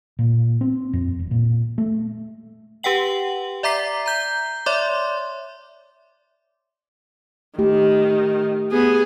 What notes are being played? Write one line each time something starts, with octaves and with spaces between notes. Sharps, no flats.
A#2
C4
F2
E1
A#2
A3
G4 B4 F#5 G5 F#7
D5 E5 A#5 D6 B6 C7
A#5 G6 G7
C#5 D5 E5 C6 D6
D#3 A3 G4
B3 G#4